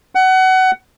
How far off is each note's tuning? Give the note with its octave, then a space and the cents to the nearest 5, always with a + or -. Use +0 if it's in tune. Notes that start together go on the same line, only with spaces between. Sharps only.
F#5 +25